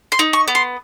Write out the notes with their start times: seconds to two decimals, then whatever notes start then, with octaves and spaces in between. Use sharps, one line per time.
0.12 C6
0.19 D#4
0.33 C#6
0.48 B3
0.55 C6